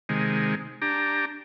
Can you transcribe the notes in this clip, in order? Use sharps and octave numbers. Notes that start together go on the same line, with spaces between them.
C3 D#3 G#3
D4 G4 A#5